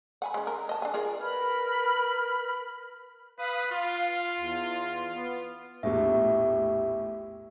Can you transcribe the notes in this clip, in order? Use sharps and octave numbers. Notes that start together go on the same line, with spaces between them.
F#5 G#5 B5
G#3 C#4
A#4
D#5 A5
D4 G#5
F4 G#4 A#4
A#4 B4 B5 F6
B4 F5 B5 D#6
F4 F5
E2
B3
A#1 E2 A2 G4 E5